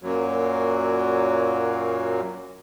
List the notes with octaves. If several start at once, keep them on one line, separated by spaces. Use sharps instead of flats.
F#2 A#2 F#3